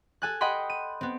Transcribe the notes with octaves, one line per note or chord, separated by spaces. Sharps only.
A4 G#5 F#6
D#5 F#5 G5 B5 C6
D#7
B3 C4